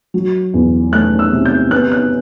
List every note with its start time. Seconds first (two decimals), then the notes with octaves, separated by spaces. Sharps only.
0.14 F#3
0.54 E2
0.92 A3 F#6
1.19 E6
1.32 C3
1.45 G6
1.71 B3 F#6
1.92 F#6